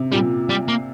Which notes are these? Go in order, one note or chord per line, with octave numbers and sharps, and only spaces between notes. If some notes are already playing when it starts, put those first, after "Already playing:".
Already playing: C3
A#2 G3
G3
A#3